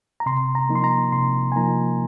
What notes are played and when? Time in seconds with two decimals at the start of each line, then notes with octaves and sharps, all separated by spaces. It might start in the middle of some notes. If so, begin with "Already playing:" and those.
0.20 A#5
0.26 C3 C6
0.55 A#5
0.69 F3 A#3 D#4
0.75 C6
0.84 A#5
1.12 C3 C6
1.52 G#5
1.56 F3 A#3 D#4 A#5